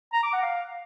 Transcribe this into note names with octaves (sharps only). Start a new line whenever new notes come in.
A#5
D6
F#5
F5